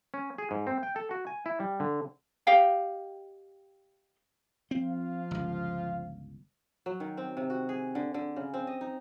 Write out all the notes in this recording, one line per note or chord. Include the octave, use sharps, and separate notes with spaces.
C#4
G#4
G#2
C4
G5
A4
F#4
G#5
E4
G3
D3
G4 D#5 F5 G5
F3 C4 F4 F5
G1 C#2
F#3
D#3
C4
C3
F#4
G#4
D3
D3
C#3
C4
D#5
D#4